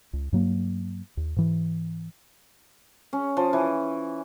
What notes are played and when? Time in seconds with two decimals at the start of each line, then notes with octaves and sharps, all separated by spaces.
0.13 C#2
0.33 G2 F#3 A#3
1.17 D#2
1.37 G#2 E3
3.13 C#4
3.37 F3
3.53 E3